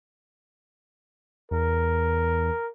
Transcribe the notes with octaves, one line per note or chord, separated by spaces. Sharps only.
E2 A#4